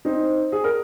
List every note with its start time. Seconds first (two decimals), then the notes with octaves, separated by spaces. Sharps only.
0.05 C4 D#4
0.52 G#4
0.64 A#4